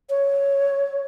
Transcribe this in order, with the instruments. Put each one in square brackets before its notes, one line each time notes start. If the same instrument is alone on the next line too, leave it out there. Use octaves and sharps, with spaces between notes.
[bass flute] C#5